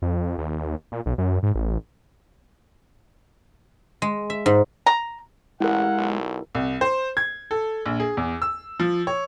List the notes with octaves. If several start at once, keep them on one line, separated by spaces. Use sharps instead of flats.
F2
D#2
A#2
B1
F#2
G#2
A1
G#3
E5
G#2
A#5
A1 G#3 E4 G4 A#4 F5 F#5
B1
C2
C5
G#6
A4
A#1
G#4
E2
E6
F3
C#5